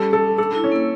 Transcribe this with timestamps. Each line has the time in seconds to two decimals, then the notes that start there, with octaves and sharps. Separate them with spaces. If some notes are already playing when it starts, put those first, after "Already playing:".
Already playing: G3 C#4 A4
0.13 A4
0.38 D4 A4
0.55 E4
0.64 C#4
0.72 A#3